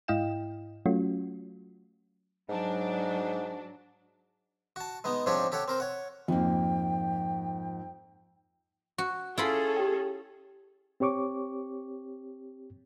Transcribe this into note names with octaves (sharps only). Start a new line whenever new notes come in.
G#2 E4 D#5 F5 G5 E7
F#3 A3 C#4 F4 F#4
G#2 F#3 D4
F#4 A5
G#3 B3 D#4
G#2 F3 C4 D4 G4 C#5
G4 A4 C#5 F#5
C4 A#4 C5
C#5 F#5
F2 G#2 A#3 G5
F#4 C#6
C#4 E4 F4 G#4 A4 B5
G4 G5
C4 G4 C#5 C#6 D6